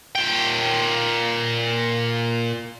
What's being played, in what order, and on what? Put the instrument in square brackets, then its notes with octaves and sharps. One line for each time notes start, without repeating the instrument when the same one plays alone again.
[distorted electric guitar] A#2 G5